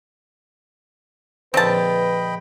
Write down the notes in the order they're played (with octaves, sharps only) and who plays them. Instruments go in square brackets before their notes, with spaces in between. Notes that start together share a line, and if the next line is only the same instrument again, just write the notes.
[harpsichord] A#1 D3 [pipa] C4 A5 [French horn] B4 [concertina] D#5 G5 B5